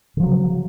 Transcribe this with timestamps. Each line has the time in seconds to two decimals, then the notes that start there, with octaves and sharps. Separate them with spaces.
0.17 C#3
0.20 F3
0.23 F#3